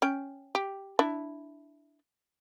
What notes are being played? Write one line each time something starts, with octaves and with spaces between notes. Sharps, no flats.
C#4 G5
G4
D4 E4